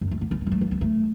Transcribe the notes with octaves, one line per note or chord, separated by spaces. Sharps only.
F#2
A3
B3
C#4
B3
F#3
A3
F#3
B3
A3